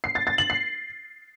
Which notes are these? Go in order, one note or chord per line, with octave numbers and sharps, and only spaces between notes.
C7
A6
A6
F#7
C7